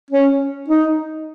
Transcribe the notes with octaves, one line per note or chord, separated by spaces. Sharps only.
C#4
D#4